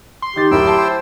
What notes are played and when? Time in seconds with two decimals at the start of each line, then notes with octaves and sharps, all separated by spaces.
0.22 C6
0.36 D#3 G4 A6
0.52 D1 E4 A#4 G5 E6
0.67 A5
0.78 C5